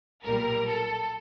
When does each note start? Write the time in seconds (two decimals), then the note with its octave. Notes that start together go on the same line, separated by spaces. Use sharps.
0.23 B1 A#2 G3 A#4
0.68 A4